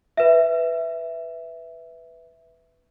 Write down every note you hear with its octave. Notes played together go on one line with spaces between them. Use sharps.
B4 E5